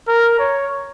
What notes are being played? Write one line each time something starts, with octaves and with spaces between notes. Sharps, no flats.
A#4
C#5